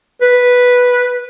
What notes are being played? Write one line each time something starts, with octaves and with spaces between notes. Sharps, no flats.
B4